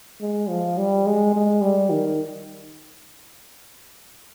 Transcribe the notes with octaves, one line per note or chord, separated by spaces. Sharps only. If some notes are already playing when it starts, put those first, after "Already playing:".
G#3
F3
G3
G#3
G#3
G3
D#3